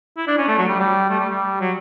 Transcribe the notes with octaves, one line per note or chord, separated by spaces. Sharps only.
E4
D4
C#4
A3
F#3
G3
G3
A3
G3
G3
F#3